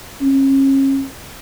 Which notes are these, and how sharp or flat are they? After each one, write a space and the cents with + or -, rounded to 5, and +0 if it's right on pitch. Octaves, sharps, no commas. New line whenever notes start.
C#4 -35